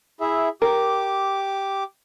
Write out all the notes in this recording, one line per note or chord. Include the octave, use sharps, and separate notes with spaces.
E4 G#4 E5
G4 A#4 D6